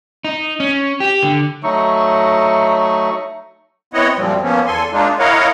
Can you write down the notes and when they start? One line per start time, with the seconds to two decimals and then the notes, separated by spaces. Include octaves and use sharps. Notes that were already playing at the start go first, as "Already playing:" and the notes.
0.24 D#4
0.60 C#4
1.00 G4
1.23 D3
1.63 F#3 A3 D#4 C#6
3.94 B3 C4 E4 C#5 D#5 F#5
4.17 F#2 A#2 F3 G3 C4
4.43 F3 A#3 B3 C#4
4.66 E2 A4 G#5 C6
4.92 G#3 A#3 D4 D#4 F4
5.19 E4 A#4 C#5 D#5 F5 F#5